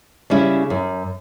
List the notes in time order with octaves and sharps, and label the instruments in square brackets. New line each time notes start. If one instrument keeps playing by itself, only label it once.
[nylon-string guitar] C#3 G3 C#4 E4
F#2